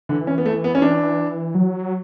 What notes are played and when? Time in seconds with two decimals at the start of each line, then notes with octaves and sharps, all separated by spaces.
0.09 D3 E3
0.27 C#4
0.38 B3
0.46 A3
0.64 B3
0.75 C#4
0.82 D4
1.55 F#3